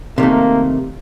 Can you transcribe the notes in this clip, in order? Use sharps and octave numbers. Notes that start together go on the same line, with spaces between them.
C3 D#3 A3 A#3